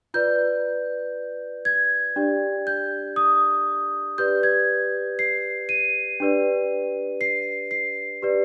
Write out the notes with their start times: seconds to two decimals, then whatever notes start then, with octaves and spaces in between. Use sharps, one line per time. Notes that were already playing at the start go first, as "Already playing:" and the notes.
0.14 F4 B4 D5 G6
1.65 G#6
2.16 D4 G4 D5
2.67 G6
3.16 D#6
4.18 G4 B4 D5 G6
4.43 G#6
5.19 C7
5.69 D#7
6.20 D4 G4 B4 D5
7.21 C7
7.71 C7
8.22 G4 B4 D5